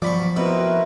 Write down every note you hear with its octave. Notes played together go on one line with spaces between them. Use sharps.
G2 B2 F3 F#3 D5 B5 C#6
B2 C4 E4 F#4 A#4 B4